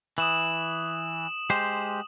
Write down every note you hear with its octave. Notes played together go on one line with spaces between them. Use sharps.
E3 D#6 E7 F#7
G#3 G4 C5